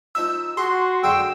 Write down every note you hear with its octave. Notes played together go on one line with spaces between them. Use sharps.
F3 D#4 E5 E6
F#4 G#4 C6
F#2 D3 G#4 G5 E6